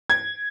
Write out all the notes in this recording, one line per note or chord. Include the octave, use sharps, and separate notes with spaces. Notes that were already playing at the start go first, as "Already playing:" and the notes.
G#6